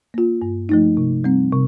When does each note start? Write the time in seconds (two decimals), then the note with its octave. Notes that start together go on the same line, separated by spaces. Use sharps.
0.14 A#3 F4
0.42 G2
0.69 F3 A3 D#4
0.97 C3
1.24 G3 C4
1.52 C3